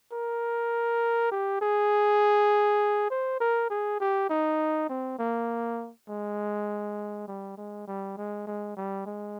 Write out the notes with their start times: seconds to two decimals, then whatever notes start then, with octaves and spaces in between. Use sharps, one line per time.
0.12 A#4
1.31 G4
1.62 G#4
3.11 C5
3.40 A#4
3.70 G#4
4.00 G4
4.30 D#4
4.89 C4
5.19 A#3
6.09 G#3
7.28 G3
7.58 G#3
7.88 G3
8.17 G#3
8.47 G#3
8.77 G3
9.06 G#3